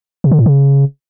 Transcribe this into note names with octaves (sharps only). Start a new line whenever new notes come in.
C3
D3
A2
C#3